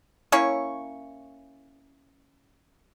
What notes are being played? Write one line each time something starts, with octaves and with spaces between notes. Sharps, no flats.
A#3 C#4 E4 C#5